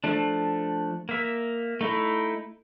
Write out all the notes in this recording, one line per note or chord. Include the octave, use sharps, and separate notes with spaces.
F3 A3 D4
A#3 E5
A3 D#4 E4